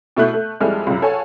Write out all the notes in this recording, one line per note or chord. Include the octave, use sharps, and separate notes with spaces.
B2 A3 E4 F#6 G6
A3
F2 G3 G#3 E4 A4 F6
C#2 F#2
A4 C#5 F5 F#5 G#5